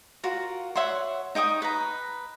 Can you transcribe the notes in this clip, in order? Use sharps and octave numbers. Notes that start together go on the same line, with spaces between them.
F4 F#4 A#4
C#5 E5 F#5 C6
D#4 G5 C#6 D#6
B4 A#5